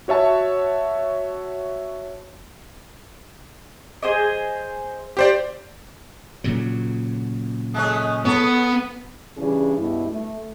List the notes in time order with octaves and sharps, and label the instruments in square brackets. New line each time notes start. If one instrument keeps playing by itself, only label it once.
[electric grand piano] F#4 C#5 E5 A5
[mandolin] G#4 C5 D#5
[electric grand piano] G4 C5 D5
[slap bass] A#2 C#3 F#3
[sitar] G#3 A3 C#4 [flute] D#6
[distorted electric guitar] B3 [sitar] A4 C#5
[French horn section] C#3 E3 G3 D4 G#4
G2 B2 E4
A3